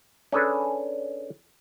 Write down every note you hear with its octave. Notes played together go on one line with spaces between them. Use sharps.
C#4 D4 G#4 A4 B4